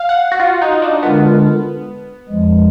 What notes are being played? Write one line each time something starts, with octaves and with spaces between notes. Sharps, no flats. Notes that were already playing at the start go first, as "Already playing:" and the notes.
Already playing: F5
F#5
F#4
F4
D#4
D4
D3 G#3 B3 D4 F4 A#4
F2 F3 G#3